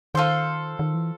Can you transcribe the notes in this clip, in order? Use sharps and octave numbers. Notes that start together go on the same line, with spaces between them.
D#3 F4 A4 C5
D#3
E3